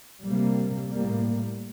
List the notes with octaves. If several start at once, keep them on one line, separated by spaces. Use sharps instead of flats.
C3 G3 A#3
A2 G3 A#3